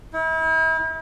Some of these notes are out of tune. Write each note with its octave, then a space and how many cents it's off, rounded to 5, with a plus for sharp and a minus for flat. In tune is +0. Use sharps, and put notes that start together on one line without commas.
E4 -40